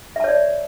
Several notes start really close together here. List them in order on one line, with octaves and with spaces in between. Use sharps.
E5 A5 C#5 D5